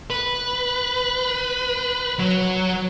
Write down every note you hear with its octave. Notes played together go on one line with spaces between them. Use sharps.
B4
F#3